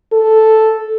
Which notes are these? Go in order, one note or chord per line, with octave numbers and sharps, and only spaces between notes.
A4